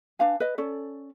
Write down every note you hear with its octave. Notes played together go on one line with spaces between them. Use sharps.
D4 B4 F5 G#5
B4 D#5
C#4 A4 D5